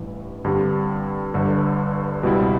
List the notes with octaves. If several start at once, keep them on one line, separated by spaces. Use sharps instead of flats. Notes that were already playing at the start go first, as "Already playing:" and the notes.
Already playing: A1 G2 E3
G2 D3 G3 C4
G1 G2 D3
C#2 B2 G3 C4 E4